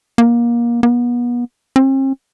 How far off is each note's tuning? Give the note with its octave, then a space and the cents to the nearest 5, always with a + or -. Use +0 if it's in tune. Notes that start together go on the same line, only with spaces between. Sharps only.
A#3 +25
B3 -35
C4 +45